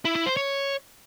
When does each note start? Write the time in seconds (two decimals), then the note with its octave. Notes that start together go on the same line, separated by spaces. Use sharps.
0.05 E4
0.16 E4
0.26 C5
0.37 C#5